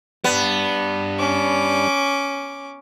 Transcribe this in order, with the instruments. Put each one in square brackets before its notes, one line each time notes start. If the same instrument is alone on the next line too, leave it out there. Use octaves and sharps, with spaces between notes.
[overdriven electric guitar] G3 D4 [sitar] B3
[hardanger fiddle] C#4 D6